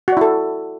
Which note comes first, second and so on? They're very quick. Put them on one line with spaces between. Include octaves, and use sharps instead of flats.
F#4 D5 E4 A4